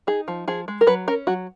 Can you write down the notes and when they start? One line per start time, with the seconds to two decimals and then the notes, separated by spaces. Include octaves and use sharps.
0.07 D#4 G#4
0.28 F3
0.48 F3 G#4
0.68 G#3
0.81 A#4
0.87 F#3 B4
1.08 C#4 A#4
1.27 F#3 F#4